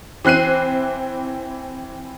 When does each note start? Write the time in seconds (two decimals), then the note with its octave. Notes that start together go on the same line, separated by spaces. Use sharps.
0.24 E3 C4 F#6 C7 D#7